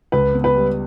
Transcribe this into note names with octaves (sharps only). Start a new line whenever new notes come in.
C#2 B4
B3
B4
G3